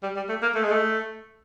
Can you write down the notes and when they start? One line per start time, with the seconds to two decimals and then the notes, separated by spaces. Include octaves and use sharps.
0.03 G3
0.16 G3
0.29 A3
0.42 A#3
0.55 A3
0.64 G#3
0.72 A3